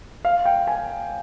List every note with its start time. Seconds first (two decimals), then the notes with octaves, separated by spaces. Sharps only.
0.25 F5
0.45 G5
0.67 G#5